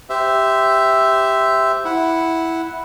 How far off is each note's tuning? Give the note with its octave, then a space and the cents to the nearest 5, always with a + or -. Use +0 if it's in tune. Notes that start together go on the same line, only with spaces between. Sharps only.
G4 +0 C5 -20 E5 +0
E4 -5 F#5 +0